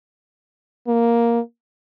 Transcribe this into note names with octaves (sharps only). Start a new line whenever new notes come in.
A#3